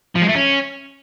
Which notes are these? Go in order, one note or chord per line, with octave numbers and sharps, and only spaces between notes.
F3
G#3
A3
C#4